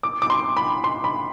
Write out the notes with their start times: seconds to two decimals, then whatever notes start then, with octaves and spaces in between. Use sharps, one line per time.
0.03 D6
0.22 D6
0.30 C6
0.57 B5
0.84 C6
1.04 B5